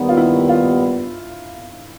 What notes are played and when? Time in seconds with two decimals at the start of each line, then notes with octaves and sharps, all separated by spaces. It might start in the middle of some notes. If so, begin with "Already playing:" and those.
Already playing: D#2 D#3 G3 B3 D#4
0.09 F4
0.17 E4
0.49 F4